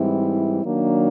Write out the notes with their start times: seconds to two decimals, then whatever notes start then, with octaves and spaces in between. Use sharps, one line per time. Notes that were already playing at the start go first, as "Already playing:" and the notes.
Already playing: G#2 E3 G3 C4 E4
0.64 D#3 F#3 A#3 D4